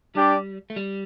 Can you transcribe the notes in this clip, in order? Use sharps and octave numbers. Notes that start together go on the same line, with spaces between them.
G3 D4 G4 D5
A3
G3